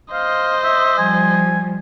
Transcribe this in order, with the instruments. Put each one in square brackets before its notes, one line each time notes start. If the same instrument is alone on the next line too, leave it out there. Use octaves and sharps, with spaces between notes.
[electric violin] C5 D#5 [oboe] F5
[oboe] E5
[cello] F3 G3 [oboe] G#5